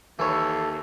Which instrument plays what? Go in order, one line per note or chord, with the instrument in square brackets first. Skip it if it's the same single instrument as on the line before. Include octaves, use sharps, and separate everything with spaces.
[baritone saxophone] D#2 [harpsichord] E3 C#5 [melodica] A4